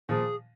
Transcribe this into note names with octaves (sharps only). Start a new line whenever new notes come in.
A#2 F3 G#4